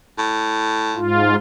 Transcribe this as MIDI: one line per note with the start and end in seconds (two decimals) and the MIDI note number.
0.18 0.98 45
0.95 1.36 44
0.95 1.36 65